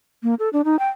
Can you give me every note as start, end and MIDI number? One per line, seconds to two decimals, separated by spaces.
0.23 0.34 58
0.39 0.49 69
0.53 0.62 62
0.65 0.78 63
0.79 0.88 79